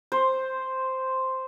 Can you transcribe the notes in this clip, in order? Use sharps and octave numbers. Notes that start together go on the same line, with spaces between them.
C5